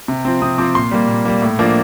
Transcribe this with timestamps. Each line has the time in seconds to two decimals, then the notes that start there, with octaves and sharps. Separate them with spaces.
0.08 C3
0.25 F3 C4
0.42 C3 D#6
0.58 F3 C4 D6
0.75 A#2 C6
0.91 G3 A#3
1.08 A#2
1.25 G3 A#3
1.42 A2
1.59 F3 A#3 D4